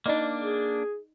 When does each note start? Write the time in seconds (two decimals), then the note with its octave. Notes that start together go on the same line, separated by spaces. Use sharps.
0.06 A#3 D4 D#4 D5 D#5
0.39 G#4